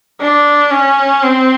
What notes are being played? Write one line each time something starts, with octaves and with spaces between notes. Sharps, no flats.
D4
C#4
C4